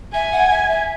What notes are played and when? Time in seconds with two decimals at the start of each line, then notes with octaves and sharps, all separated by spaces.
0.14 E5 G#5
0.32 F#5
0.51 E5
0.69 E5